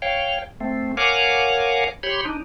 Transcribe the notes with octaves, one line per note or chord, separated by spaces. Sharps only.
C#5 F5 G5
A3 C4
A#4 C#5 F5 F#5 G#5 D6
G4 C#5 B5 C6
D4 D#4